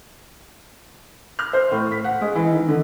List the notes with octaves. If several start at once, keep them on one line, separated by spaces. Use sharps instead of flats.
F6
C5
A2
B6
F#5
G#3
E3
D#3
D3